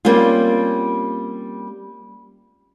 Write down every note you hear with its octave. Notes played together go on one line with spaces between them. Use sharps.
G3 A#3 C4 C#4 F4